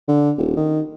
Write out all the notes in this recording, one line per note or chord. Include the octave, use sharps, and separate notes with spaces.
D3
D#1
D#3